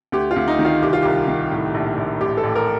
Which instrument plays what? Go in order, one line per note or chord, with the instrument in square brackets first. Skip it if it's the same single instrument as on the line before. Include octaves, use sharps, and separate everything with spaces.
[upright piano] D2 G4
F4
D2
D#4
D#3
F4
C2 G4
F4
C2 G4
D#3
A2
A#1
A#1
A1 G4
A4
A1
A#4